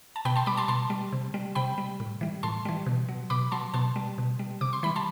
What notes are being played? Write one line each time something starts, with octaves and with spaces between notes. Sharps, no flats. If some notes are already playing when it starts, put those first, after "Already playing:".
A5
B2 G5 B5
A5 C6
G3 B5 D6
A5 C6
B2 A5 C6
G3
C3
G3
C3 G5 B5
G3
A2
E3 G3
A2 A5 C6
E3 G3
B2
F#3
B2 B5 D6
F#3 A5 C6
B2 A5 C6
G3
B2
G3
C3 D6
C6
E3 G3 B5
A5 C6